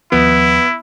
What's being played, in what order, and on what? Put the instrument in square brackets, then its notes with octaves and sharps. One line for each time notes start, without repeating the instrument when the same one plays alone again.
[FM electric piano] D#2 F3 [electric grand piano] B3 [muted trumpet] E4